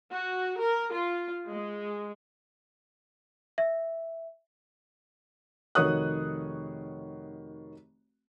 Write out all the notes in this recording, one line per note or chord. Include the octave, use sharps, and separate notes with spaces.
F#4
A#4
F4
G#3
E5
F1 D#3 F#4 C#5 D#6 F#6